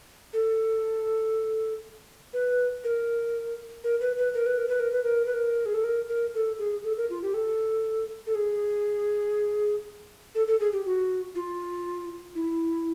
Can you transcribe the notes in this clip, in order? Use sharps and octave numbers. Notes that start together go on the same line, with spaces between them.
A4
B4
A#4
A#4
B4
B4
A#4
B4
A#4
B4
A#4
B4
A#4
B4
A#4
G#4
A4
A#4
A#4
A4
G#4
A4
A#4
F4
G4
A4
A4
G#4
A4
A4
G#4
G4
F#4
F4
E4